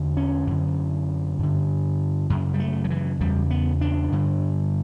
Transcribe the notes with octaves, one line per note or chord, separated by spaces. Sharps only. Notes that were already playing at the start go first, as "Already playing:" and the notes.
Already playing: E2 D3
C#4
F#2 D3
G2 D3
F#2 C#3
G3
A3
F#3
E3
E2 C#3 G3
B3
D4
G2 D3